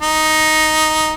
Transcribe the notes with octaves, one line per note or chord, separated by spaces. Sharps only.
D#4